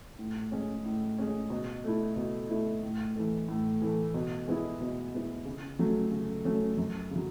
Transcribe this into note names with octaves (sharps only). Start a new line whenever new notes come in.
A2
G#3 C#4
A2
G#3 C#4
B2
A3 E4
B2
A3 E4
A2
E3 A3
A2
E3 A3
B2
G#3 B3 E4
B2
G#3 B3 E4
C#3
F#3 A3 C#4
C#3
F#3 A3 C#4
F#2
C#3 F#3